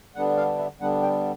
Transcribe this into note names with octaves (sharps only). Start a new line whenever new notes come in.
D3 G3 B3 D4 F#5
F5
E5
D3 G3 B3 D4 F#5
G5